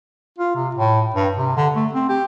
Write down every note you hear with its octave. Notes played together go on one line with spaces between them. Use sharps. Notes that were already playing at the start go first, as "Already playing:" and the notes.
F4
C3
A2
G2
C3
D3
A3
C4
G4